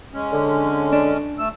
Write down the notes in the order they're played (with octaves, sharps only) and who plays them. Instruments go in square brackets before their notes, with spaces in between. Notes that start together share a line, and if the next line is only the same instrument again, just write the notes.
[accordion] G#3 C#4
[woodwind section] D3
[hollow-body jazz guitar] D4
[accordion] A3 E6